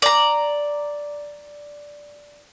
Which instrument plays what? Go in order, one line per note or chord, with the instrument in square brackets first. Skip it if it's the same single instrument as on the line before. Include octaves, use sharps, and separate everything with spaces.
[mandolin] D5 A#5